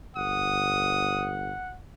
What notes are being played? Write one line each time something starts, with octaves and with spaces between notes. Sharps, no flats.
G1 F#5 D#6